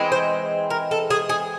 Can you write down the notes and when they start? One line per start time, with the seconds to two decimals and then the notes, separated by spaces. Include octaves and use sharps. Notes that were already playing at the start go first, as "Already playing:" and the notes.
Already playing: E3 G#3 C4
0.12 C5
0.70 A#4
0.91 A4
1.10 G#4
1.29 G#4